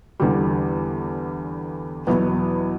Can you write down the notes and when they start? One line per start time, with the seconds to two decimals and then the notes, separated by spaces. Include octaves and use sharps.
0.20 E2 D3 G3
2.07 E2 B2 F#3 B3 E4